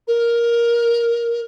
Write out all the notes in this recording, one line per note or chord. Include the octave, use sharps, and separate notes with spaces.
A#4